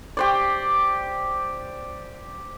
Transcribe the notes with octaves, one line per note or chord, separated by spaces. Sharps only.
G4 C5 D5